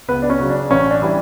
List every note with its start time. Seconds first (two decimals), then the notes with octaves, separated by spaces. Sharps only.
0.08 C#2 B3 B4
0.22 D4
0.30 C#4
0.40 C#3 F#3
0.50 D4
0.70 A1 C#4
0.91 D4
1.02 E3 G3